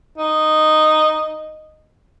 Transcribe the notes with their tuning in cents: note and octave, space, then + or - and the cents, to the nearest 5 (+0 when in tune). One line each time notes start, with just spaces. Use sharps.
D#4 -10